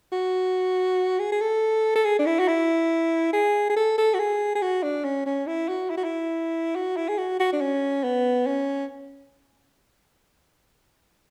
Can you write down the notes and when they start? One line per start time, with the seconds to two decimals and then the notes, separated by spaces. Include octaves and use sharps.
0.12 F#4
1.19 G#4
1.32 G#4
1.41 A4
1.95 A4
2.05 G#4
2.19 D4
2.26 E4
2.39 F#4
2.48 E4
3.33 G#4
3.70 G#4
3.76 A4
3.98 A4
4.14 F#4
4.19 G#4
4.55 G#4
4.62 F#4
4.83 D4
5.04 C#4
5.26 C#4
5.47 E4
5.69 F#4
5.90 E4
5.97 F#4
6.04 E4
6.75 F#4
6.96 E4
7.08 G#4
7.18 F#4
7.40 F#4
7.53 D4
7.61 C#4
8.04 B3
8.46 C#4